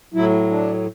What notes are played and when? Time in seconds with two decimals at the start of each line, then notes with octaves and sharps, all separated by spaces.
0.14 A2 F#3 E4
0.50 D4